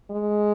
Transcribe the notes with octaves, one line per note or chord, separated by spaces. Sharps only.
G#3